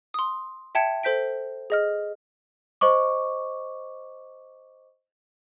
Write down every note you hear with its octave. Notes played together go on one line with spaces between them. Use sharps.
C6 D#6
E5 G5 A5 G#6 C#7
A4 C5 G6 B6 D7
G#4 D#5 F6
C5 D#5 C#6 D6